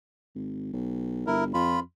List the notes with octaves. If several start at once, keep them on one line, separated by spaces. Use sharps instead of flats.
G#1
B1
G1 E4 A#4
F2 F4 B5